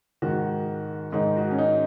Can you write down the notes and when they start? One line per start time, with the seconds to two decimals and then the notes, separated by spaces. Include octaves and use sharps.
0.22 G#2 D#3 F#4
1.12 G#2 D#3 D#4
1.36 F#4
1.51 C#4
1.59 D#4